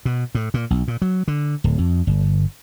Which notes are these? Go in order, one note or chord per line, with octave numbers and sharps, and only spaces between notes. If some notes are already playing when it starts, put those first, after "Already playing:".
B2
A2
A#2
B1
A#2
F#3
D3
D1
F2
G1